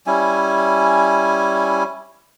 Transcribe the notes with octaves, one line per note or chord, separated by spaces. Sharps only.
G3 C#4 E4 G#5